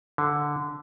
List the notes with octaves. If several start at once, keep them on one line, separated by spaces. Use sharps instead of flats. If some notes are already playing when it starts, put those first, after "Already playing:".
D3